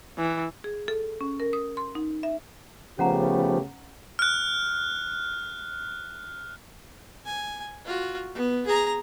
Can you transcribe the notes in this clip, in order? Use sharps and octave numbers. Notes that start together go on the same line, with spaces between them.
E3
G#4
A4
C#4
A#4
D#6
C6
D#4
E5
C#3 F3 A3 B3 C#4 G4 F#5 A#5
F6 F#6
G#5
F4 F#4
B3
G#4 A#5